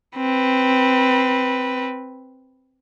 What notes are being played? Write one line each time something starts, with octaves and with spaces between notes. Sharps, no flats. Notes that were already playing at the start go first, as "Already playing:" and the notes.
C4 B4